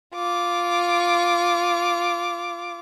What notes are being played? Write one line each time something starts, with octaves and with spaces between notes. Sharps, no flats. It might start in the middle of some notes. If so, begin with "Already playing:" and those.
F4 D6